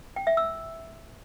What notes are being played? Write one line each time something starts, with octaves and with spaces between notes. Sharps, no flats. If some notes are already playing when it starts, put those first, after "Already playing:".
G5
E5
E6